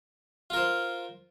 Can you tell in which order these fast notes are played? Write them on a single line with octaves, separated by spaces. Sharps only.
F4 A#4 C5